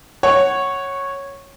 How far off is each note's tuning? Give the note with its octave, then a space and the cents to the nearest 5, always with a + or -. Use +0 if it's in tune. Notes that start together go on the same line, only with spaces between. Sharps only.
C#5 -10 F#5 +10